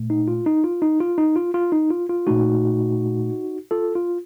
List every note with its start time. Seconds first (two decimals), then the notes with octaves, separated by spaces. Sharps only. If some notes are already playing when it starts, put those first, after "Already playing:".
Already playing: A#2 A3
0.10 D#4
0.28 F4
0.46 D#4
0.64 F4
0.82 D#4
1.00 F4
1.18 D#4
1.36 F4
1.54 F4
1.72 D#4
1.91 F4
2.09 F4
2.27 A#2 A3 D#4 F#4
3.71 F4 A4
3.95 F4